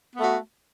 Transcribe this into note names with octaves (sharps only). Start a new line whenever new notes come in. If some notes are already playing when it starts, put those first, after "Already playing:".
A3 B3 F#4